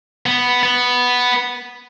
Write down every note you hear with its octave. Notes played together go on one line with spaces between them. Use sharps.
B3
B3